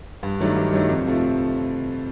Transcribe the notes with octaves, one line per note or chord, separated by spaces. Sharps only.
G2
D#3 F#3 A3 D4
G2
D#3 F#3 A3 D4
F2
C3 F3 A3